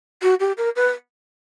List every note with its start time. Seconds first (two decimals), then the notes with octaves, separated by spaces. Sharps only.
0.22 F#4
0.40 G4
0.57 A#4
0.75 B4